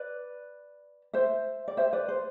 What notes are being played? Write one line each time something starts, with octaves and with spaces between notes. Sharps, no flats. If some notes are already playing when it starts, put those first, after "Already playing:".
Already playing: B4 D5
C5 E5
D5
C5 E5
B4 D5
C5